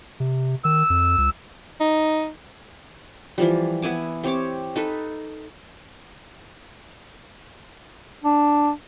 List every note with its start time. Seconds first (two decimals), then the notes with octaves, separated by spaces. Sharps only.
0.20 C3
0.65 D#3 E6
0.90 F2
1.18 C#2
1.80 D#4
3.38 E3 F3 G3
3.82 B3 E4 G#5 D6
4.24 C4 G4 C#5 D6
4.76 D#4 A4 B4
8.24 D4